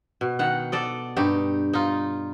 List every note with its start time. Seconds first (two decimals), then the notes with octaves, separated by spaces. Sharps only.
0.21 B2
0.39 D#3 F#5
0.72 A4 D5 D#5
1.16 G2 D#4 G4
1.73 D#4 F4